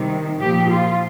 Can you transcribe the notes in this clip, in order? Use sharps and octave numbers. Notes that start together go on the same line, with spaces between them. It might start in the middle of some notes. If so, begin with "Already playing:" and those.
Already playing: C3 D#3 G3
A#2 F3 G4
F4